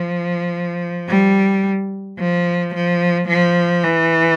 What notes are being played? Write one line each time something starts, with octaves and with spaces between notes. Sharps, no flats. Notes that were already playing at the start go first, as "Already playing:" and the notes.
Already playing: F3
G3
F3
F3
F3
E3